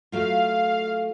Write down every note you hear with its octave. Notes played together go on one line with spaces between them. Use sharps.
F#3 A3 F4 F5